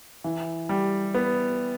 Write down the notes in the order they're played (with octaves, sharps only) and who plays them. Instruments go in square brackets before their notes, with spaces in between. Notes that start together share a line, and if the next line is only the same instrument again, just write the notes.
[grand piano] E3
G3
B3